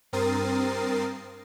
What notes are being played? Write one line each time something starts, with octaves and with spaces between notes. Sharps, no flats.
G2 C4 A#4 D#6 A6 C7